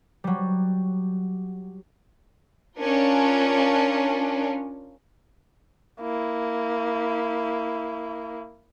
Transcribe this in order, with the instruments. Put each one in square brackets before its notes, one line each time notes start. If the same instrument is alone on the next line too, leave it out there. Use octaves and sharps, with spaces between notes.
[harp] F#3 G3
[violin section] C#4 D4 F4 A#4
[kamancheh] A#3 E4